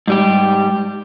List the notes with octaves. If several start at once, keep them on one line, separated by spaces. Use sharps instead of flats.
G#2 G3 G4